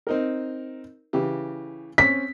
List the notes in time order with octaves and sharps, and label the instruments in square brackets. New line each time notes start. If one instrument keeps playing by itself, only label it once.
[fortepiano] C4 D#4 A#4
C#3 E3 G4
[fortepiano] C4 C#4 [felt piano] B6